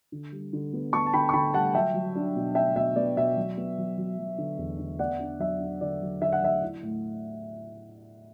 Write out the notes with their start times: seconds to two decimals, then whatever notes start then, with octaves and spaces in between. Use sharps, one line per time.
0.12 D3
0.32 G3
0.53 D3
0.73 B3
0.93 B3 A5 C#6
1.06 A5
1.13 D3 G5 B5
1.29 C#6
1.33 D3 G5 B5
1.53 G3 F#5 A5
1.74 F#3 E5 G5
1.94 F#3
2.15 D4
2.36 B2
2.55 D4 E5 G5
2.76 B2 E5
2.96 B3 D5
3.17 B2 E5
3.37 F#3
3.57 B3
3.78 F#3
3.98 F#3
4.19 F#3
4.38 D3
4.58 E2
4.79 D3
4.99 B3 D5 F#5
5.19 D4
5.40 F#3 E5
5.60 D4
5.81 D3 D5
6.02 F#3
6.21 D3 E5
6.33 F#5
6.42 F#3 E5
6.62 E4
6.83 A2